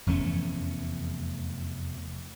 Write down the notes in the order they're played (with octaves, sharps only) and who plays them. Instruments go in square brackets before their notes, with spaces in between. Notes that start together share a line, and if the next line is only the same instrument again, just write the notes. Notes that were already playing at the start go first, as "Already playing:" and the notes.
[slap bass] F1 E2 A3 C#4